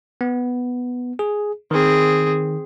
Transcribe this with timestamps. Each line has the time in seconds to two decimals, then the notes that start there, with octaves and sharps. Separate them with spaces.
0.21 B3
1.19 G#4
1.71 D#3 C4 G#4